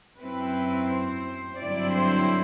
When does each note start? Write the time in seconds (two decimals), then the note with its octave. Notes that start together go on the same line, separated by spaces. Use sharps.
0.19 F#2 F#3 C4 E4 B4
0.88 C5
1.58 G2 D3 F#3 C4 E4 D5
1.93 C5